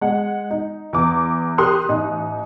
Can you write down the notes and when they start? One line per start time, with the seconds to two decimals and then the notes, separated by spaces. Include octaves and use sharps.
0.01 G#3 F#5
0.51 D#4
0.93 E2 D6
1.58 G4 A#4 C6 D#6 F#6
1.89 A1 D#4